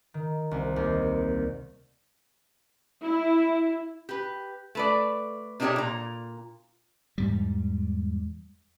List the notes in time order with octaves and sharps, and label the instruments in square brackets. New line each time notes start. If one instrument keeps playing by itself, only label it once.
[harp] D#3
C2
D#2
[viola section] E4
[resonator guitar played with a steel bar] G4 B4
A3 B4 D5
C3 D4 D#4 G4 A#4 C#5
A#2 A#5
[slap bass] E2 G#2 G3